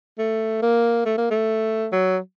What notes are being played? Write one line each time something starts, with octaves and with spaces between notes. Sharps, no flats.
A3
A#3
A3
A#3
A3
F#3